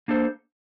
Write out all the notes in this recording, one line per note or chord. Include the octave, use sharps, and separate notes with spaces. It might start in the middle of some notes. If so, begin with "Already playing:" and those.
A#3 D4 A4 C5